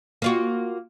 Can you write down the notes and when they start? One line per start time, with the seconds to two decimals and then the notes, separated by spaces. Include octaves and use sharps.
0.22 A#3 F4 F#4